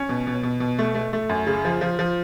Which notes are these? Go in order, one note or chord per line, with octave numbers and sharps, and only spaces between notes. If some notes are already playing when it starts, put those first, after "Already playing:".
Already playing: C#4
B2
B2
B2
B2
A3
A3
A3
F#2
C#3
F3
F3
F3